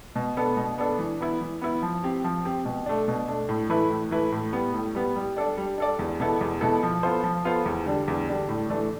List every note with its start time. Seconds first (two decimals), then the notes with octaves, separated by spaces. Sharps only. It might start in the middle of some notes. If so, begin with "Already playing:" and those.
0.16 B2
0.37 B3 D4 A4
0.57 B2
0.78 B3 D4 A4
0.99 E3
1.20 B3 E4
1.41 E3
1.62 B3 E4
1.82 F3
2.04 C4 G4
2.24 F3
2.45 C4 G4
2.65 B2
2.86 A3 D4
3.08 B2
3.28 A3 D4
3.49 A2
3.69 E3 A3 E4 B4
3.90 A2
4.11 E3 A3 E4 B4
4.32 A2
4.53 G3 B3
4.74 A2
4.95 G3 B3
5.16 G3
5.36 D4 A4 D5
5.57 G3
5.78 D4 A4 D5
5.99 E2
6.20 B2 B3 E4 A4
6.41 E2
6.61 B2 B3 E4 A4
6.83 F3
7.03 B3 F4 A4 C5
7.23 F3
7.45 B3 F4 A4 C5
7.66 E2
7.86 D3 G3 D4
8.08 E2
8.28 D3 G3 D4
8.49 A2
8.69 E3 A3 D4